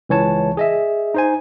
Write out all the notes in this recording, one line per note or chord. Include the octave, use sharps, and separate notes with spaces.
C#2 E3 C#5 A5
G#4 D#5 E5
D#4 C5 G#5